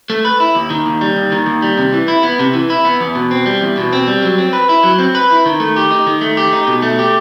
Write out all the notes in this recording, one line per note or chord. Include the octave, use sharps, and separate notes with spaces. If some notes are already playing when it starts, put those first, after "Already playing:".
A3
B4
E4
D#2
D#3
D#2
G3
D#2
D#3
D#2
G3
C3
E3
E4
B3
C3
E3
E4
B3
E2
B2
C4
G3
E2
B2
C4
G3
F#3
C4
B4
E4
F#3
C4
B4
E4
D#3
A3
G4
D#4
D#3
A3
G4
D#4
B2
A3
G4